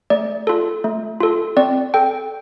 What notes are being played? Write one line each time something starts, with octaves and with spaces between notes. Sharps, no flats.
A3 D5
F4 A4
A3
F4 A4
C4 D5
A4 G5